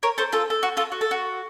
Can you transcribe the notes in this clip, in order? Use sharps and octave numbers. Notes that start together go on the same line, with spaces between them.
A#4 C#5
A4 C5
F4 A4
A4
F#4
F4 A4
F#4
A4
F#4